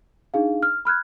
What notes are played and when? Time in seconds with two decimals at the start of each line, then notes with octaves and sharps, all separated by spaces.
0.34 D4 D#4 G#4 F5
0.63 F6
0.85 B5 F6 F#6 G#6